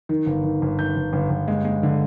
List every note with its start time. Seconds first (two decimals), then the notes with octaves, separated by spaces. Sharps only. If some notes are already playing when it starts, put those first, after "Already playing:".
0.09 D#3
0.26 G1
0.44 D#3
0.62 G1
0.79 D#3 G6
0.97 G1
1.13 G1
1.30 G1
1.48 G#3
1.65 G#3
1.83 D3